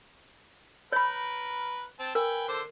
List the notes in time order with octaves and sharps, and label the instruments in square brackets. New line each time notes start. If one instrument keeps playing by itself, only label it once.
[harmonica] A#4 B4 [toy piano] C#5 B5
[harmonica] C4 A5
[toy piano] A#4 [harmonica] B4 G5 G#5
[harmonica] D3 A4 C5